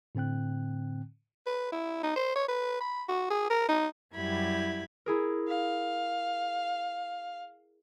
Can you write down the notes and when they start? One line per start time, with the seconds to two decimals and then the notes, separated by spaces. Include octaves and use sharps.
0.15 A2 D3 C4 G5 F#6
1.47 B4
1.72 E4
2.03 D#4
2.16 C5
2.36 C#5
2.48 B4
2.80 B5
3.09 F#4
3.30 G#4
3.50 A#4
3.69 D#4
4.15 F#2 G3 E4 G4 B5 G#6
5.06 E4 G#4 A#4
5.48 F5